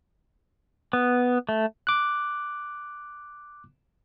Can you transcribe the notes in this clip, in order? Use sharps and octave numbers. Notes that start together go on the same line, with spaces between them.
B3
A3
D6 F#6